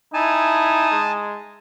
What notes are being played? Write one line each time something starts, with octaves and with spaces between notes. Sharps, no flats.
D#4 E4 G#5 A5
G#3